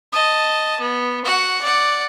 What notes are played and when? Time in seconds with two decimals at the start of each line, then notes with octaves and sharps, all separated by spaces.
0.13 D#5 A5
0.80 B3
1.25 F#4 F#5
1.61 D5 F#5